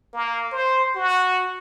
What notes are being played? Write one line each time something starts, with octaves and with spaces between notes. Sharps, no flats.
A#3
C5
F#4